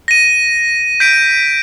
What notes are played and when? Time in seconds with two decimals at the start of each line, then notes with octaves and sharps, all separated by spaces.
0.08 A#6 D#7
1.00 G6 B6 D7